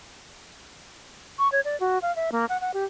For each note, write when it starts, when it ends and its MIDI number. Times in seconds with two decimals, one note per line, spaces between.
1.39 1.50 85
1.52 1.61 73
1.65 1.79 74
1.80 1.99 66
2.02 2.14 77
2.16 2.30 76
2.32 2.46 58
2.49 2.60 78
2.61 2.72 78
2.74 2.85 67